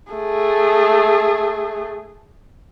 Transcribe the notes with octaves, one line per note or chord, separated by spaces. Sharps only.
A3 G#4